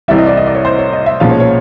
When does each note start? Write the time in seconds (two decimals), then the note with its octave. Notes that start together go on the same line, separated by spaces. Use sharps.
0.08 C2 C3 E3 G3 E5
0.18 D#5
0.27 D5
0.37 D#5
0.47 D5
0.55 C#5
0.65 C5
0.78 C#5
0.93 D#5
1.06 E5
1.20 B1 A#2 F3 G#3 C#4 F5
1.30 C#5
1.40 C#5